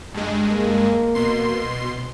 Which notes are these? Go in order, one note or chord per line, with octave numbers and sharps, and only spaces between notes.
G2 G#3
A#3
B2 C6